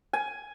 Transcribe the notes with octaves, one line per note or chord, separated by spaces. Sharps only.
G#5